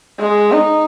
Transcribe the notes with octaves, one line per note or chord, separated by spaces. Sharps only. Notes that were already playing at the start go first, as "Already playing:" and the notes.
G#3
D#4